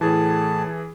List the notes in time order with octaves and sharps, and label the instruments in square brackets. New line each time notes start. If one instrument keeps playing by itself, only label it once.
[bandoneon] A2 A5 [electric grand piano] E3 G#4